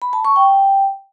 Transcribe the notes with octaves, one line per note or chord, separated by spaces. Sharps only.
B5
A5
C#6
G5